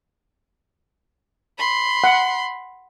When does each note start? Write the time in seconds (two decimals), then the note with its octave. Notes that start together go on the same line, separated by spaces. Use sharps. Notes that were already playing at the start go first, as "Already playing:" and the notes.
1.58 B5 C6
2.04 F#5